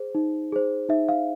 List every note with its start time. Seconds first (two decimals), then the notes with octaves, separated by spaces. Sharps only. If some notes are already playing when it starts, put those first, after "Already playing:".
Already playing: G#4 C5
0.15 D#4
0.52 G#4 C5
0.89 D#4 E5
1.09 F5